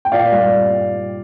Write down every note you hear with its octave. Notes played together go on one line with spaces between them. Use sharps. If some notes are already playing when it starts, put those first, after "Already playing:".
G5
A#2 D5 F5
G3